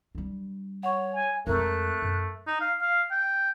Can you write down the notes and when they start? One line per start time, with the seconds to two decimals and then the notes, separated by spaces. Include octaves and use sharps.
0.15 G3 D4
0.83 C#5 F#5 C#6
1.13 G#5
1.47 F2 G#3 A3 A#4 A#5 F#6
2.02 F#2
2.47 D#4
2.61 F5
2.81 F5
3.11 G5